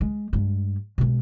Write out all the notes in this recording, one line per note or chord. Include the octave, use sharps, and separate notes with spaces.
G#3
G2 G#3
B2 G#3